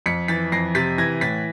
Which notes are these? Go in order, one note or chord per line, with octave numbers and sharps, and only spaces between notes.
F2 B6 C#7
E3 A6 B6
F2 A#6 C7
C3 A6 B6
E3 G#6 A#6
A2 A6 B6